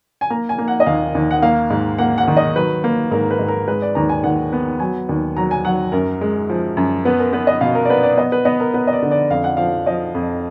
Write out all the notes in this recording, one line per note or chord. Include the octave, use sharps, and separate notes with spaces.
G#5
A#3 A#5
G#5
A#3
F#5
D#5
D#2 F5
D#2
F#5
A#3 F5
G#2
A#3 F#5
F#5
D#3
D#5
F#3 B4
A#3
G#2 A#4
B4
G#2
A#4
G#3 B4
D5
D#2 A#5
G#5
D#2 F#5
B3
F#3 G#5
D#2
F#3 A#5
G#5
F#3 F#5
F#2 A#4
G#3
F3
F#2
B3 B4
A#4
B3 B4
D#5
B2 F5
A#4
D5
B3 B4
D5
B3 D#5
B4
B3 D#5
A#4
B3 B4
D#5
D5
D3
D5
F2 F5
F#5
F3 F5
F3 D#5
F2